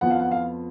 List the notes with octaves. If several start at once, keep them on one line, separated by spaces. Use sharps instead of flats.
F2 F3 B3 F#5
F5
F#5
F5